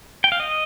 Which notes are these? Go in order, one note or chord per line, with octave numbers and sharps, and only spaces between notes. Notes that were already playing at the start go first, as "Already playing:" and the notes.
G5
F5
D#5